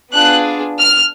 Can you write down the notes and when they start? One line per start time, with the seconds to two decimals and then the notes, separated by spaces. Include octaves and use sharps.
0.13 B3 D4 F4 G#4 F#6
0.80 F6